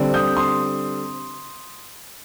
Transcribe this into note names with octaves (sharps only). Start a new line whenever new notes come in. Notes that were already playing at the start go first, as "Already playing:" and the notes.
Already playing: D3 G3 C4
D#6 G6
C6 D#6